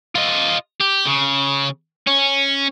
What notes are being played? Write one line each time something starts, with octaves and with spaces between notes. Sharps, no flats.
F4 D#5
G4
C#3
C#4